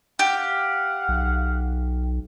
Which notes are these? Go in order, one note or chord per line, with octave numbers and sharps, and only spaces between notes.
G4 F5 F#5
B1